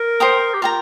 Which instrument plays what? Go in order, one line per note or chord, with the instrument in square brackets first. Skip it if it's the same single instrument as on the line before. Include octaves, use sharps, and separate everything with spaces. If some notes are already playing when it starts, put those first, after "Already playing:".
Already playing: [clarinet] A#4
[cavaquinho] C5 G5 A#5 D#6
[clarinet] G4
[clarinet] F4 [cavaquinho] A#4 G5 A#5